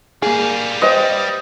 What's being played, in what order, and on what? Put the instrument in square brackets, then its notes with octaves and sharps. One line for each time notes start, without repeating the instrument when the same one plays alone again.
[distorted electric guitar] G3 F5 [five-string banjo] A#3 G#4
[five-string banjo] B4 C5 G5 [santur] D#5